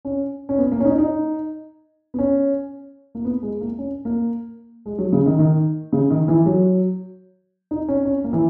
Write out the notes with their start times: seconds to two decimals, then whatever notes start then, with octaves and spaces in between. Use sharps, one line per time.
0.05 C#4
0.49 C#4
0.58 B3
0.72 A#3
0.80 C#4
0.85 D#4
0.98 D#4
2.14 B3
2.19 C#4
3.15 A#3
3.25 B3
3.43 G#3
3.61 A#3
3.78 C#4
4.05 A#3
4.86 G#3
4.99 F#3
5.12 C#3
5.26 D#3
5.39 D#3
5.92 C#3
6.10 D#3
6.28 E3
6.46 F#3
7.71 D#4
7.89 C#4
8.05 C#4
8.24 A#3
8.33 E3